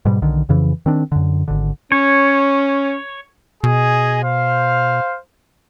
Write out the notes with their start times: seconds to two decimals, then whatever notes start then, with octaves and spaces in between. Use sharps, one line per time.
0.05 G#2 B2 G3
0.22 B1 D3 D#3
0.49 F2 C#3 E3
0.86 D#3 C4 D4
1.12 F#2 D3
1.48 G#1 D3
1.92 C#4 C#5
3.64 B2 G#4 D#5 G#5
4.23 C5 F5